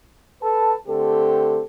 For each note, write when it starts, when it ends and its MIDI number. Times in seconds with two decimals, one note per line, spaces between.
0.42 0.75 69
0.42 0.75 71
0.42 0.75 81
0.87 1.61 50
0.87 1.61 57
0.87 1.61 60
0.87 1.61 67
0.87 1.61 69